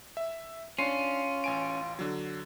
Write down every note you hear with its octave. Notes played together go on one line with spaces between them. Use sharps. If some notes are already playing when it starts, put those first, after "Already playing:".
E5
C#4 D4 F4 C7
A1 G#5 D7
D3 F#3